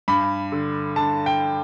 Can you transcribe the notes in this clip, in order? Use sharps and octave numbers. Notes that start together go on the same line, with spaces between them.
G2 B5
D3
D3 A5
G5